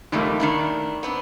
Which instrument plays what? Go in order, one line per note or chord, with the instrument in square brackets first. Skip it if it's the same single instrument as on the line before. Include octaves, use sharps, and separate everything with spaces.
[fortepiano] D#2 A3 [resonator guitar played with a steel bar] F3 G3 A#3
[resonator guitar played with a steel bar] D#3 D4 E4
B3 C4 D4